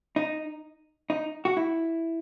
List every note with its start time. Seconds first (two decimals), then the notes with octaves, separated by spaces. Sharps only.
0.16 D#4
1.10 D#4
1.45 F#4
1.57 E4